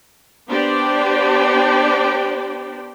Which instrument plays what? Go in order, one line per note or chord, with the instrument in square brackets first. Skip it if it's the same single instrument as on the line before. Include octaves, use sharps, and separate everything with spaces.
[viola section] B3 D4 G4 C5 D5 G5